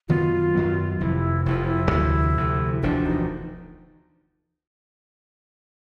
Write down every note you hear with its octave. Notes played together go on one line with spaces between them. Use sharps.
F#2 D#3 F#3 B3 F4
F#2 D#3 F#3 B3
F1 F2 C3 F3 E4
F1 F2 C3 F3 E4
F4
E4
D2 C3 F3
D2 C3 F3
E1 D2 D3 F3 D4
D#4